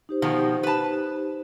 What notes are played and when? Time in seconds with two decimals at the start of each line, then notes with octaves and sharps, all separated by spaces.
0.09 D#4 G4 C5
0.22 B2 D#3 F3
0.63 B4 A5